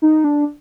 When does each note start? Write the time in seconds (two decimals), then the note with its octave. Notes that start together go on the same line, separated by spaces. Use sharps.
0.02 D#4
0.24 D4